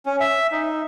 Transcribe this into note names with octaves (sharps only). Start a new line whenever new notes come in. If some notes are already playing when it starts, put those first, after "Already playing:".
C#4
E5
D#4